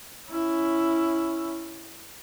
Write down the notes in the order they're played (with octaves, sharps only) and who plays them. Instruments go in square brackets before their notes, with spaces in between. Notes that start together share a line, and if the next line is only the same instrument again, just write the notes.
[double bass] C#4 E4